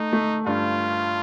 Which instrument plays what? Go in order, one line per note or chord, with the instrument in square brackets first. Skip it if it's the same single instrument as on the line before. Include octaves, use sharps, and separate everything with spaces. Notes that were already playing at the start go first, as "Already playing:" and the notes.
Already playing: [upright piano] A3 [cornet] D#4
[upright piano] A3
[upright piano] G2 [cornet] F4